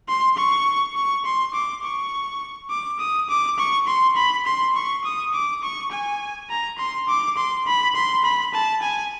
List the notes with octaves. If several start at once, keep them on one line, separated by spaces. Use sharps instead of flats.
C6
C#6
C#6
C6
D6
C#6
D6
D#6
D6
C#6
C6
B5
C6
C#6
D#6
D6
C#6
G#5
A#5
C6
D6
C6
B5
C6
B5
A5
G#5